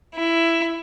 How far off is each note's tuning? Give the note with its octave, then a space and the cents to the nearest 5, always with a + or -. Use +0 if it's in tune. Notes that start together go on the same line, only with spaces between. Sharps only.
E4 +10